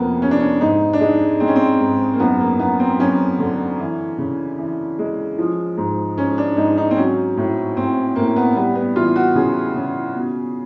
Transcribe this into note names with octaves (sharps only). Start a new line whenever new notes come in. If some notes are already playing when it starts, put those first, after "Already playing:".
Already playing: F2 C3 A#3 B3
C3 C#4
D4
C#4
G#2 D#4
D4
G#3 D#4
G#3 C4
C#4
C4
G#2
A#3
F#2 B3
A#3
F#2 B3
C4
F#2 C#4
D3
E3
C#3
E3
G#3
F3
G#2
G#2 C#4
D4
G#2 D#4
D#4
C4
F#3 C#4
A2
A2 C4
A2 A#3
B3
G3 B3
B3
E3 F4
F#4
C#3 G#4
C#3
B2